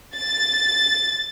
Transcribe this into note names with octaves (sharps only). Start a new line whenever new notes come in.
A6